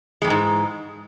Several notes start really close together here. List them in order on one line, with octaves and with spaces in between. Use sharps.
G#3 F2 E3 G#2